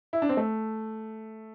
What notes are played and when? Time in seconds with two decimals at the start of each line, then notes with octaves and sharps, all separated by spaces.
0.13 E4
0.22 D4
0.29 C4
0.37 A3